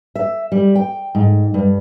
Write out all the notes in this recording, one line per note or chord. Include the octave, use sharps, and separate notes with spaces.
E5
G3
G5
G#2
G2